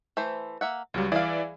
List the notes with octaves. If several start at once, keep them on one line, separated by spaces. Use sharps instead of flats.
E3 A3 C5
A#3 E5 F#5
C#2 F#3 G3 F4
E3 G#4 D5 E5 F5